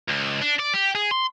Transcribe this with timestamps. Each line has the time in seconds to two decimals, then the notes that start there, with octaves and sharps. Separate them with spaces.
0.08 C#2
0.42 D4
0.60 D5
0.74 G4
0.95 G#4
1.11 C6